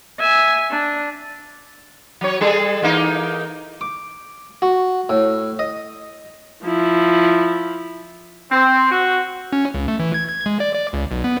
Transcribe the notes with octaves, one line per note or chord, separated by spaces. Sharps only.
E5 G#5
D4
F#3 C#5
G3 G#4 A4
E3 A#3 D#4
D6
F#4
A2
D#5
F3 E4
C4
F#4
C#4
C#2
A3
E3
G#6
G#6
G#3
D5
D5
C#2
B1
B3